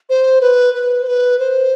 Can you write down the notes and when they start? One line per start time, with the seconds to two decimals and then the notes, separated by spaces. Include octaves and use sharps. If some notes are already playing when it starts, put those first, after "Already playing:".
0.09 C5
0.41 B4
0.74 B4
1.02 C5
1.07 B4
1.39 C5